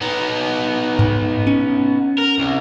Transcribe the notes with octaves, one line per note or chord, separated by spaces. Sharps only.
B3 D#4
G#2
C#4
A#4
C2